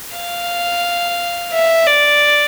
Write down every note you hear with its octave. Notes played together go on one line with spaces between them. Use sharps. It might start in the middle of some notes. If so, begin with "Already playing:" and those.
F5
E5
D5